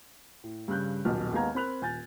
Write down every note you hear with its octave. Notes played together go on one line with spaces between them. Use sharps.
A2
G2 C#3 F#6 G6
D#1 B1 B2 F6
D#2 G#3 B3 F5 A#5 G#6
C4 A#4 B5 F#6 F7
D#1 G#5 G6 A6